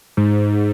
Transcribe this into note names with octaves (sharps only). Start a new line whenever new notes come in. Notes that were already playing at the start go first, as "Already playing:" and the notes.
G#2